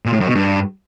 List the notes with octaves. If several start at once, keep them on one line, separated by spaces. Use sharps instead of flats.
A#2
A2
F#2
B2
G2